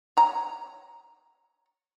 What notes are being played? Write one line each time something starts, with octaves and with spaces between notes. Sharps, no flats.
C#5 A#5